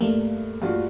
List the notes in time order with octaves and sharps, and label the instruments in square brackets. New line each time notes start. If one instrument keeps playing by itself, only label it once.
[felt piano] G2 [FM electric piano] A3 A#3
[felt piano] G2 F4 F#4